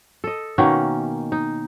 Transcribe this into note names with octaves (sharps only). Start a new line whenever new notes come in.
A4 D#5
B2 D#3 A#3 C#4
D#4